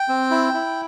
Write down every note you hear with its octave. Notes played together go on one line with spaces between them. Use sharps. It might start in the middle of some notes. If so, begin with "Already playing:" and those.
Already playing: G5
C4
E4
E4